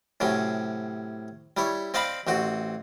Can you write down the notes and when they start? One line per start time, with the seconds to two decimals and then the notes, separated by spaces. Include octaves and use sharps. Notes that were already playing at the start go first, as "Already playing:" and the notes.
0.20 A2 C3 F#3 C#4
1.57 G3 E4 C#5
1.94 C4 D5 D#5 F5 A5 B5
2.27 A1 C4 F#4